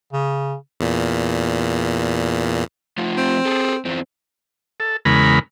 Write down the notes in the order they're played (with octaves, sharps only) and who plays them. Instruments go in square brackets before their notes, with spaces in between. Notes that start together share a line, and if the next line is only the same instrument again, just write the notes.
[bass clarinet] C#3
[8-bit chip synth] E2 A#2
[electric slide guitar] F3 A3 F4
[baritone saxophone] C4
[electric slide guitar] G#4 A4
E2 C4
[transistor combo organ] A4
E2 C#3 G#3 A#4 B5